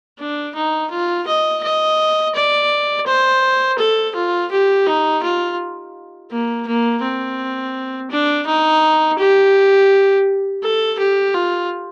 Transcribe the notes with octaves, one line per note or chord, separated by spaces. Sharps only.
D4
D#4
F4
D#5
D#5
D5
C5
A4
F4
G4
D#4
F4
A#3
A#3
C4
D4
D#4
G4
A4
G4
F4